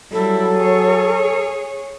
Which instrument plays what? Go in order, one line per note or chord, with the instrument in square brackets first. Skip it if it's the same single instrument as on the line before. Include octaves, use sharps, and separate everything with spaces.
[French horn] F#3 [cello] G3 E4 [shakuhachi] A4
[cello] G#4 C#5